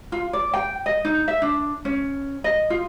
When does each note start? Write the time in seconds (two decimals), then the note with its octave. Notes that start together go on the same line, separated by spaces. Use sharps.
0.12 F4
0.33 D5
0.54 G5
0.86 D#5
1.05 D#4
1.28 E5
1.42 D4
1.85 C#4
2.44 D#5
2.70 F4